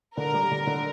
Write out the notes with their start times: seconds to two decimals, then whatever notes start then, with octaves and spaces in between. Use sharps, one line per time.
0.17 D3 A#4
0.34 G3
0.51 D3
0.67 D3